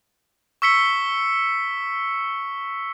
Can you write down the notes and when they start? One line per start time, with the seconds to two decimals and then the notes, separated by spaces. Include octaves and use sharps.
0.62 C#6 E6 B6 C#7 G7